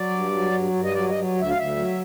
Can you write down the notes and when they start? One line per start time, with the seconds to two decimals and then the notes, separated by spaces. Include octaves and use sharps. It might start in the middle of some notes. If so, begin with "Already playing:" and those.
Already playing: F#3 D5
0.10 G2
0.31 F#3
0.52 G2
0.72 G2
0.84 D#5
0.94 F#3 D5
1.09 D#5
1.14 F#3
1.35 D2
1.41 E5
1.49 F5
1.56 D2 E5
1.76 F#3